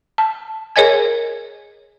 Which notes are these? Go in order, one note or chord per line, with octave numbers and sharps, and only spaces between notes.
A5
G#4 A#4 C#5 D#5 G#5 G#6